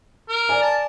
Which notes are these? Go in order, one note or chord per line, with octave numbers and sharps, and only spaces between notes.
A#4
D5 G#5
A5